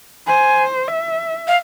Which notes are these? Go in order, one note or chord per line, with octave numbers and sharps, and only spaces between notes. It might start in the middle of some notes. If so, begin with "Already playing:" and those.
C5 G#5
E5
F5